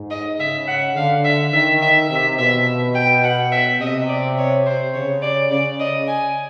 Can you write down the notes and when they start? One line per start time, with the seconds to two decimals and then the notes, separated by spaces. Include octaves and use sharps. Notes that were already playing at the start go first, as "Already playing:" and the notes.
Already playing: G#2
0.11 D#5
0.39 C#3 E5
0.68 F#5
0.96 D3 F5
1.25 E5
1.53 D#3 E5
1.82 E5
2.10 C3 E5
2.38 B2 E5
2.95 G5
3.24 F#5
3.52 E5
3.80 C3 D#5
4.09 D5
4.38 C#5
4.66 C5
4.94 C#3 C#5
5.22 D5
5.51 C#3 D5
5.80 D#5
6.08 G#5